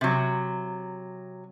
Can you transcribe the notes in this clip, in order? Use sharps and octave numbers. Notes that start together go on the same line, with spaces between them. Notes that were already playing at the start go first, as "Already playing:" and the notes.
C3 F#3